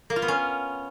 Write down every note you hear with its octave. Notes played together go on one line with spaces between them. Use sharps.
A#3
F4
B3
C#4